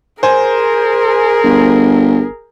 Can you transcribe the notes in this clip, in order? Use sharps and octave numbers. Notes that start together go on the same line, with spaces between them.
G#4 A#4 C5 G#5
G1